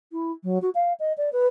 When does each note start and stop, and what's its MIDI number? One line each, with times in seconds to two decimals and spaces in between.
0.12 0.32 64
0.44 0.58 54
0.62 0.70 66
0.75 0.93 77
1.00 1.13 75
1.18 1.30 74
1.33 1.47 71